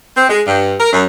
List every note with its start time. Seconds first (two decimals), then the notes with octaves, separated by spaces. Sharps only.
0.16 C4
0.29 G#3
0.46 G2
0.79 A#4
0.92 F#2